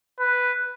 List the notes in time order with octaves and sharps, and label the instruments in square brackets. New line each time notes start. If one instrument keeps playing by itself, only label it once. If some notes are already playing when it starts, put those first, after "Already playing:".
[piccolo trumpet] B4